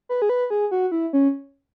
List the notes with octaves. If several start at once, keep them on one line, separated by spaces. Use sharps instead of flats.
B4
G#4
B4
G#4
F#4
E4
C#4